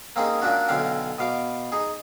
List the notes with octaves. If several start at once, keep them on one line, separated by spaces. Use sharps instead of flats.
A#3 C4 C#4 D#4 G#4
A#2 A#3 C#4 D4 F#4
B1 D3 C#4 F5 G5
B2 F5 D6
D#4 G#4